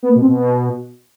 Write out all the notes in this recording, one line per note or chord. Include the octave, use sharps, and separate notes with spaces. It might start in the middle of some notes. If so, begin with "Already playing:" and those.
B3
A#3
B2
C4
B2